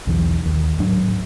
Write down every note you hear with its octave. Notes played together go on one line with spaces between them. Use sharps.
B1 E2 E3
D#2
D1 G#2 F#3 D4